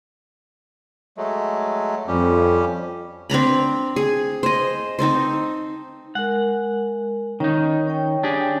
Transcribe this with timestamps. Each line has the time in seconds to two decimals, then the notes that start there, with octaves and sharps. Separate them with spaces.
1.18 F#3 G#3 A3
2.08 F2 G3 C#4 G4
3.30 C4 D4 A#5 B5
3.96 G#4
4.43 C5 D#5
4.99 C4 D#4 A4 C5
6.15 G#3 A#4 F#5
7.40 D#3 C#4 D#4 C#5
7.87 C#4 C#5 G5
8.23 D4 G4 G#4